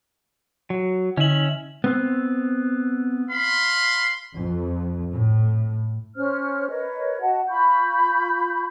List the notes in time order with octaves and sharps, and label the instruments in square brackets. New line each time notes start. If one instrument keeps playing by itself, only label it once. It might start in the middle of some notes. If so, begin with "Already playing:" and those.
[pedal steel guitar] F#3
[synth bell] D3 F#7 [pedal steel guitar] C#4 E5
[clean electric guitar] B3 C4
[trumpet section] F5 B5 C6
[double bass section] F2
A2
[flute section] C#4 C5 F6
A#4 B4 C#5 D#5
F#4 D#5 F#5 A5
F4 B5 C#6 G6